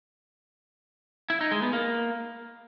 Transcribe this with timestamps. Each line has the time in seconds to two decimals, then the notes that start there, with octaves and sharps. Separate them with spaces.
1.30 E4
1.41 D#4
1.51 G#3
1.62 B3
1.73 A#3